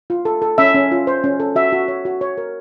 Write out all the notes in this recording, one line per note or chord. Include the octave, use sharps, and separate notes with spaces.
F4
A4
A4
C#4 E5
C#4
F4
C5
C#4
A4
F#4 E5
F#4
C#5
F#4
C#5
A#4